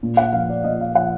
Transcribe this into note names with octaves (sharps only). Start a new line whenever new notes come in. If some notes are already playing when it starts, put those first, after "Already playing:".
A#2
F#5
F3 F5
D5
A#2 D#5
F5
F3 F#5